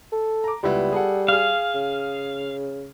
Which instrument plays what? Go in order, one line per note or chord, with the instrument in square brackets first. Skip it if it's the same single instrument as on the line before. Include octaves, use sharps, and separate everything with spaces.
[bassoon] A4
[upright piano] A#5 D6
[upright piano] C#2 B3 E4 [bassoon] G3
[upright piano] G#4 A4 F#5
[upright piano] G#4 F6 [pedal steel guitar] F5
[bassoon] C#3